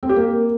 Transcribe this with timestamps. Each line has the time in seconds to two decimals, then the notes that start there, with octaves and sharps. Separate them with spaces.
0.03 C4
0.09 G4
0.16 A#3